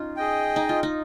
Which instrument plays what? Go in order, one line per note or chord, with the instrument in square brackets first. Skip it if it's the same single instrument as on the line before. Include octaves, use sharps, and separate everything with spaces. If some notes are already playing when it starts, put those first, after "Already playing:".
Already playing: [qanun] C#4 D#4 F4
[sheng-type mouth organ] G#4 D#5 G5
[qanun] D#4
F4
D#4